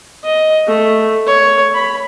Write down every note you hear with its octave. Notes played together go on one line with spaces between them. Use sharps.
D#5
A3
C#5
B5